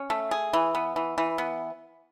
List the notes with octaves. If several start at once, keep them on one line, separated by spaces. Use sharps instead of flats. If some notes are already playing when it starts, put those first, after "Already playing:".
Already playing: C#4
A3
G#4
E3
B3
E3
E3
B3